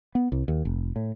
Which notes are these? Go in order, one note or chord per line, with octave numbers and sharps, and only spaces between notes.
B3
C2
D#2
F1
A2